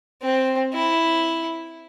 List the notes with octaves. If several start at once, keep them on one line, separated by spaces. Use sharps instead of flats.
C4
E4